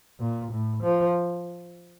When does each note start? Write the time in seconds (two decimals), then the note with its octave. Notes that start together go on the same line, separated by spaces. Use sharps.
0.20 A#2
0.51 A2
0.83 F3